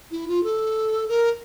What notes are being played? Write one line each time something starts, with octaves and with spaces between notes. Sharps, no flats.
E4
F4
A4
A#4